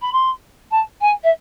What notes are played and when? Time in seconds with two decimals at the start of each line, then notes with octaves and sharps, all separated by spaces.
0.01 B5
0.12 C6
0.71 A5
1.01 G#5
1.23 E5